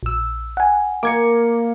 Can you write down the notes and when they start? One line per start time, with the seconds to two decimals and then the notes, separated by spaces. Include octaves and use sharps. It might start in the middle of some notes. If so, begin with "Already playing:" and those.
0.03 A#1 E6
0.57 F#5 G#5
1.03 A#3 D6 G#6 C#7